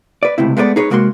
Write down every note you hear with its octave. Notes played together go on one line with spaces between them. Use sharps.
B4 D5
C#2 A2 C3 E4
G#3 A3 B3 A#4 D5
D#4 G#4 B4 C#5
C3 G#3 A#3 F#4 C6